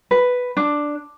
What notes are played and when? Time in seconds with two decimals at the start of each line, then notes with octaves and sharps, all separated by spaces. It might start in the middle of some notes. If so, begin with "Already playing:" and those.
0.11 B4
0.57 D4